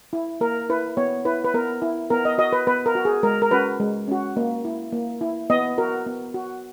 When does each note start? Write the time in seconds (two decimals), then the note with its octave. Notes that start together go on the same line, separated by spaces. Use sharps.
0.13 E4
0.41 A#3 A#4
0.69 E4 B4
0.97 B3 C#5
1.25 E4 B4
1.44 B4
1.54 B3 A#4
1.82 E4
2.10 B3 A#4
2.25 D#5
2.38 F#4 D#5
2.53 B4
2.67 B3 B4
2.86 A#4
2.95 F#4
3.05 G#4
3.23 G#3 A#4
3.42 A#4
3.51 C#4 F#4 B4
3.80 G#3
4.08 C#4 F#4
4.37 A#3
4.65 E4
4.92 A#3
5.21 E4
5.50 B3 D#5
5.78 F#4 A#4
6.06 B3
6.34 F#4